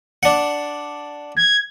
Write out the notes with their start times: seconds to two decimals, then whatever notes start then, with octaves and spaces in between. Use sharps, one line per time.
0.23 D4 F#5
1.37 G#6